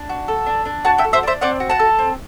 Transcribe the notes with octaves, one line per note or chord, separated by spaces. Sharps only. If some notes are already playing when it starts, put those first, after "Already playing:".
Already playing: D4
F#4
A4
D4
D4
F#4 F#5 A5
E5 G5
A4
C5 E5
D4 C5 E5
C4 D5 F#5
F#4
F#5 A5
A4
C4